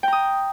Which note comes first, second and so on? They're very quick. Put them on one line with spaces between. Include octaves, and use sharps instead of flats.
G5 A#5 D#6